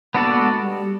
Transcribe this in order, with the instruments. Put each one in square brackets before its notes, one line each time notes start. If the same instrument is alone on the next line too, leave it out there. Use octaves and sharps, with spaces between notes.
[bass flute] A#3 [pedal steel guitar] B3 D4 F#4 A4 D5
[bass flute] G#3
G3